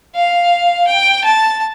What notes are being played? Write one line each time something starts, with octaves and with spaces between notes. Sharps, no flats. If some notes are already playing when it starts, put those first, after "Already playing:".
F5
G5
A5